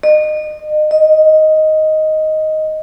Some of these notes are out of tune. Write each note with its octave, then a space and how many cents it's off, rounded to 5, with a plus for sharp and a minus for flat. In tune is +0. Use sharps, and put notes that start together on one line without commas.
D#5 -30
D#5 +5